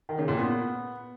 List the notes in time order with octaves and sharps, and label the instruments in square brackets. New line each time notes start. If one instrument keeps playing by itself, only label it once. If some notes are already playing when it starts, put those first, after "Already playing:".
[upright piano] D#3
C#3
A#2
B3